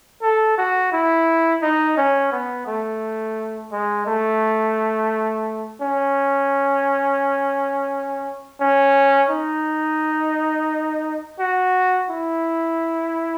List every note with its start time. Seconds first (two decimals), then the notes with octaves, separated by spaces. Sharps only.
0.22 A4
0.58 F#4
0.92 E4
1.62 D#4
1.97 C#4
2.32 B3
2.67 A3
3.72 G#3
4.06 A3
5.81 C#4
8.61 C#4
9.30 D#4
11.39 F#4
12.10 E4